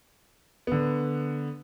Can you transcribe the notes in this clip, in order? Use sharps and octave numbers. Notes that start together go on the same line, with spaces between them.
D3 B3